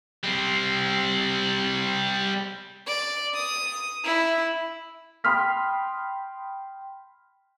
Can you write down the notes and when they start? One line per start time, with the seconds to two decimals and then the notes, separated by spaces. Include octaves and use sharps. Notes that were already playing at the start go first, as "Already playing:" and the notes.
0.24 G3 C4
2.87 D5
3.35 D#6
4.05 E4
5.24 G5 B5 C6 D#6 F6 B6